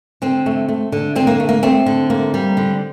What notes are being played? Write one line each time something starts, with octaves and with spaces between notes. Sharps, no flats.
D3 C4
A3
A3
D3
D3 C4
A#3
A3
A#3
A3 C4
D3
A#3
G3
D3